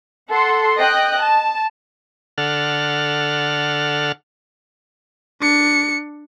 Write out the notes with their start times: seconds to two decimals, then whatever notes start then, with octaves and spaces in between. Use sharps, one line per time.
0.29 A4 F#5 C6
0.79 D#5 G5 F#6
1.21 A5
2.38 D3 A4 F#5 F6
5.41 D4 C#7